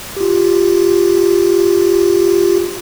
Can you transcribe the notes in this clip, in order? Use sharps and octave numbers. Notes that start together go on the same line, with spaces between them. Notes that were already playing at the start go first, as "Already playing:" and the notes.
F4 G4